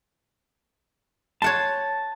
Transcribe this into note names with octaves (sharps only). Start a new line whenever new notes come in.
C#5 F#5 A5 C6